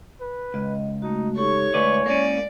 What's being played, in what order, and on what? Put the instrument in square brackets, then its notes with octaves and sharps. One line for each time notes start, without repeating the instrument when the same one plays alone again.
[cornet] B4
[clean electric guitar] C#2 [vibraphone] D#5
[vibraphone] A3 F#4 [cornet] D#4
[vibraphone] D#4 G4 A4 [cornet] C#5 [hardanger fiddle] C#6
[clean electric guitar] D2 B4 D5 [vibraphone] G#3 E4 G#5
[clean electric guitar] A#3 C#4 [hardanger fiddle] D5